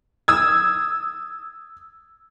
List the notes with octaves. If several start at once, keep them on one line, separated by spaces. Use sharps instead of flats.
D#6 E6 G#6